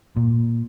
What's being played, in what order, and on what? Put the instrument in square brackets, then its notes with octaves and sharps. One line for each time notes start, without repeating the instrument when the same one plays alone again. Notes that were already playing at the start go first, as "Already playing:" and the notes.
[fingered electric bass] A#2